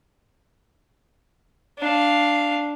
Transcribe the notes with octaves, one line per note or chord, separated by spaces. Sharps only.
D4 F5